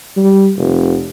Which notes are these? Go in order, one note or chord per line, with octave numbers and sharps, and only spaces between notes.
G3
F1